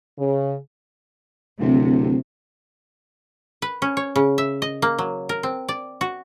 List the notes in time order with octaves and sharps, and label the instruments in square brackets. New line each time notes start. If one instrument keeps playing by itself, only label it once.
[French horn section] C#3
[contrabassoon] D1 [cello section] C3
[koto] B4
C#4
C#5
C#3
E5
D#5
A#3
F#3
A#4
C4
D5
F#4